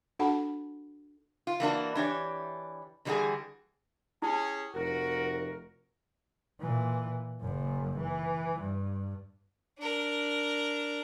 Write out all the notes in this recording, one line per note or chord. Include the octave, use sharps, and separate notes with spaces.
D4 F#4 A4 F#5 A5 B5
F4
E3 A#3 D4 F#4
E3 D4 G4 C#5
D3 E3 G3 C#4 F#4 G#4
C#4 E4 G4 G#4 A5
F1 F#4 A#4
A#2 E3
F#1 F#2
E3
G2
D4 A#4